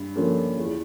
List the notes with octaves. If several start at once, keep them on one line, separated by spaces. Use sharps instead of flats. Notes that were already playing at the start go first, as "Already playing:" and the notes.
Already playing: G2
D3 F3 A#3 C#4
E2